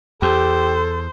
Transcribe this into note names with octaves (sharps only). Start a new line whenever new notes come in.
E2 G4 A4 C5